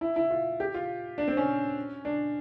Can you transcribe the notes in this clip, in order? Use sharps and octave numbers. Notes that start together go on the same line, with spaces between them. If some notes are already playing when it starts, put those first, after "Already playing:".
E4
E4
F4
G4
F4
D4
C4
C#4
D4